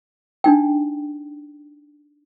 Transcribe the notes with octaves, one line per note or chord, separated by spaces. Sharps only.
D4 D#4 G5